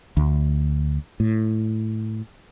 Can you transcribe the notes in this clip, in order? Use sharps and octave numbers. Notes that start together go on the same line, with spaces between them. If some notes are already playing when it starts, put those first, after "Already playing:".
D2
A2